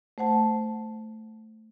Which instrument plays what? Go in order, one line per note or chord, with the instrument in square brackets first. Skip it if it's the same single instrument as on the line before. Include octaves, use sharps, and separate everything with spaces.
[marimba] A3 C5 F#5 A5